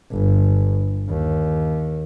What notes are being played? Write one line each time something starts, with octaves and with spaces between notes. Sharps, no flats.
G1
D#2